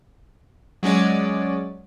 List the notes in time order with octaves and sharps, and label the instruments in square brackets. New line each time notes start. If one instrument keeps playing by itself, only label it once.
[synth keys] F#3 G#3 C#4 D5